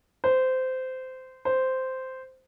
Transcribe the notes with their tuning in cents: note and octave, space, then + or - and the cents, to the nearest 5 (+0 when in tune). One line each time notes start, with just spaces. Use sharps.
C5 -20
C5 -10